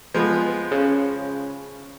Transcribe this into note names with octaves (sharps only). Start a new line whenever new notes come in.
F3 G#3 B3
C#3